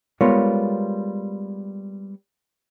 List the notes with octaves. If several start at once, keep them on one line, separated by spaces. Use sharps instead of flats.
G3 G#3 B3 F4 A#4 C#5